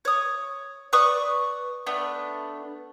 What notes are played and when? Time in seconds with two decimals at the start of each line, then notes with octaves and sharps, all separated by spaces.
0.05 C#5 D#6
0.93 B4 D5 C#6 D#6
1.86 A3 B3 D4